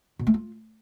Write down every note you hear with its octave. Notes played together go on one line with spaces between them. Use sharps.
B2
A3
F4